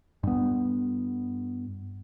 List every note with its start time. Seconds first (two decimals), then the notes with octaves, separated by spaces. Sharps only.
0.23 G2 B3